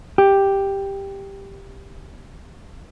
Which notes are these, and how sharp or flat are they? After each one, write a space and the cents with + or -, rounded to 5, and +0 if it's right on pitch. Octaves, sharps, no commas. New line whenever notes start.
G4 +5